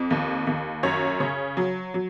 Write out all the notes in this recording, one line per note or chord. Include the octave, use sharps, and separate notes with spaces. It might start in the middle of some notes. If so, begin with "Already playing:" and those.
Already playing: F2
D#2
D#2
F#2 C#5
C#3 C#5
F#3
F#3